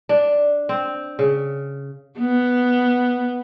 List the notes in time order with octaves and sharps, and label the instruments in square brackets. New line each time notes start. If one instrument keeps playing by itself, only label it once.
[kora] D4
C4
C#3
[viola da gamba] B3